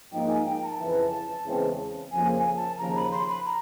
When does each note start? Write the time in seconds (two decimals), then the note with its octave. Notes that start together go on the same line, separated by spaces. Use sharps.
0.11 G#2 F3 A#3 D#4 G5
0.28 G#5
0.45 G5
0.62 A#5
0.66 A5
0.79 F2 C#3 E3
1.45 E2 C#3 E3 G#3 C4
2.12 F2 C#3 F3 A#3 G#5
2.34 G#5
2.56 A5
2.78 D#2 C#3 F3 A#5
2.96 B5
3.12 C6
3.29 B5
3.46 A#5